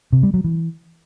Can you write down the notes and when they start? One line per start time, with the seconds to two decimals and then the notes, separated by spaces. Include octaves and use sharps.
0.13 C3
0.23 G3
0.34 F#3
0.44 E3